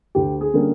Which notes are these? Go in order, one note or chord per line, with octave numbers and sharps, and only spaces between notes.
D2 G4
G#4
D3 G3 A#3 C#4